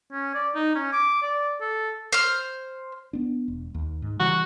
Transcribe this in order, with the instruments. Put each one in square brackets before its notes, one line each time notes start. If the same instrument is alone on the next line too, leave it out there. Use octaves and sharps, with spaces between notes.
[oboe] C#4
D5
D#4
C#4
D6
D5
A4
[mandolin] C5 F6
[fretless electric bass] B3 D4
E1
D#2
G#2
[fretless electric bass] C#3 E3 G3 [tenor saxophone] F#4